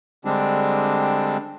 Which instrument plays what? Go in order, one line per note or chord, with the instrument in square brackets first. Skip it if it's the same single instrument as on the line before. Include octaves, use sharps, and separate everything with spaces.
[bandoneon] D3 G3 G#3 C4 D4